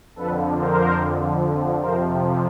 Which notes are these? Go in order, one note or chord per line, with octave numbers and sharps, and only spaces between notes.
F2 D3 F3 A4 B4
A#4 C5
F2 C3 F3 A#4 C5